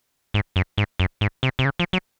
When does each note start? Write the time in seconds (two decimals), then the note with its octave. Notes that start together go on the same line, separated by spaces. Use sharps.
0.34 G#2
0.56 F#2
0.78 G#2
1.00 F#2
1.21 G#2
1.43 C3
1.59 C3
1.65 C#3
1.79 F3
1.93 F#3